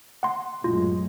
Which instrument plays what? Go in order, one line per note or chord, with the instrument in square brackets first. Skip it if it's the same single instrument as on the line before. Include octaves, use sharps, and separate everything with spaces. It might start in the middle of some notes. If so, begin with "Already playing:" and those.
[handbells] F#5 C6
[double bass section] A1 F#2 G#3 [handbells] F4